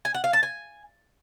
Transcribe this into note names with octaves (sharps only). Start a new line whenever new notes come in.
G#5
F#5
F5
A5
G#5